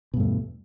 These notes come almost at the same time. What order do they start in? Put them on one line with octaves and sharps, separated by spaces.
B2 G2 A3 E2